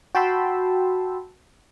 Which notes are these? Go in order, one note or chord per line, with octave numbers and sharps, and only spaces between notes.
F#4 G5 A5 B5 C6 E6